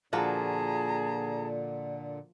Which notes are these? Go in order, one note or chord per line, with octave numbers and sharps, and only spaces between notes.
A#2 D3 F3 A#3 F#4 G#4 A5 A#5